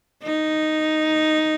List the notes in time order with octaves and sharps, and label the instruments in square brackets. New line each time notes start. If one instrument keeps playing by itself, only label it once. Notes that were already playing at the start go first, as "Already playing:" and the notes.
[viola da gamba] D#4